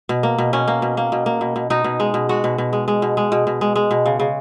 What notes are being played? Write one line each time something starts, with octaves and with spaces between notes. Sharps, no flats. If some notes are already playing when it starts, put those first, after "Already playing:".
B2
A#3
B2
B2 C#4
A#3
B2
A#3
B2
A#3
B2
B2
B2 D#4
B2
G#3
B2
G#3 F#4
B2
B2
G#3
G#3
B2
G#3
B2
B2
G#3
G#3
B2
C#3
C#3